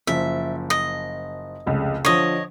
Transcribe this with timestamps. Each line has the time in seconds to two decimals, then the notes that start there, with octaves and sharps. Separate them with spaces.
0.07 F#1 F3 E5
0.70 D#5
1.66 F1 C#2 C#3
2.05 D3 F3 C#5 D#5